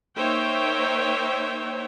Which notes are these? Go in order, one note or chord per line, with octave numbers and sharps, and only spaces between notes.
A#3 D#4 C5 C#5 E5 G5